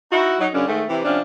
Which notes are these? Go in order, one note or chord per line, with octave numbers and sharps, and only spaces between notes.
D#4 E4 F#4
F#3 D#4
F#2 C#3 C#4 D4
G#2 D#3 A3
C3 E3
C3 F3 C#4 D4